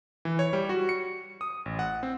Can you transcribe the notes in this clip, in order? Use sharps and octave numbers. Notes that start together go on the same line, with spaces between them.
E3
C#5
G3
F#4
C#7
D#6
A1
F#5
C4